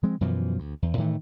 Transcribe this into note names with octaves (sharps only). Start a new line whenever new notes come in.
F3 G#3 C4
F#2 B2 E3 F3
D2
E2
A2 D#3 E3 A3